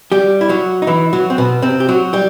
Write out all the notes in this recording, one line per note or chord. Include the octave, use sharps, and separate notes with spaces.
G3 G4
E4
F#3 F#4
D#4
E3 E4
F#3 F#4
C4
B2 B3
C3 C4
G4
F#3 F#4
G3 G4